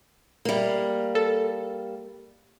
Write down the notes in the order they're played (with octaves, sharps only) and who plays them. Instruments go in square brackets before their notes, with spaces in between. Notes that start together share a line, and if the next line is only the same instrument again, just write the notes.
[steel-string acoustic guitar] G3 A#3
[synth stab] A4